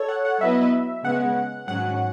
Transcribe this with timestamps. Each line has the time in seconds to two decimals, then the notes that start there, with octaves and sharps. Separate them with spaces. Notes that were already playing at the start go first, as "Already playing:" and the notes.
Already playing: A4 C#5
0.08 F#5
0.25 F#5
0.40 F#3 B3 E4 B4 D#5 E5
1.04 C#3 G#3 B3 F#5
1.67 G#2 D#3 F#3 C#4 F#5